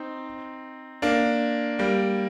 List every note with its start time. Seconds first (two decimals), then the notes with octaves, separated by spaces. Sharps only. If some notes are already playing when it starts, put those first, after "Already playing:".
Already playing: C4 D#4
1.02 A#3 D4
1.79 G3 A#3